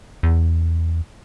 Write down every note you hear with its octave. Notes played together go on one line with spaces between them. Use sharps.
E2